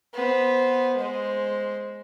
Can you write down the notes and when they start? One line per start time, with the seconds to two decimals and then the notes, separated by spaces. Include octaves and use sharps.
0.14 B3 C5
0.97 G#3 C5